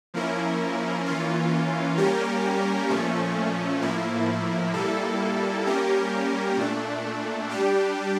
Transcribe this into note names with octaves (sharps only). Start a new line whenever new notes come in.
F3 A#3 C#4 E4 A#4
E3 A#3 C#4 F4
G3 A#3 C#4 G4 A#4
A#2 F3 A3 C#4
A2 F3 A#3 E4
A#2 G3 A#3 E4 A4
G3 A#3 C#4 G4 A#4
A#2 A3 D4
G3 D4 G4